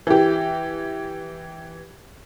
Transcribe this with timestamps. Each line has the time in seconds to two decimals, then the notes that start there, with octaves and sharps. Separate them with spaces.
0.07 E3 G4